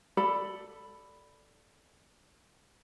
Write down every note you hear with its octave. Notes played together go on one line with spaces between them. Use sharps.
A4 D5 B5